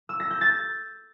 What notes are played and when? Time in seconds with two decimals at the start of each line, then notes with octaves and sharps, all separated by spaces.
0.09 E6
0.20 A#6
0.30 G6
0.41 A6